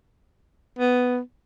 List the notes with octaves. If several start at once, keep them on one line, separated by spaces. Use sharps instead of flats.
B3